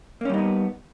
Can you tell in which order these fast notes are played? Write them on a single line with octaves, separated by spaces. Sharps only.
A#3 C#4 G3 D#4 B3